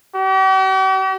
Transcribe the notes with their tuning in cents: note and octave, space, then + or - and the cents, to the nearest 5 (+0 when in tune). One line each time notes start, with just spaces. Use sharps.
G4 -45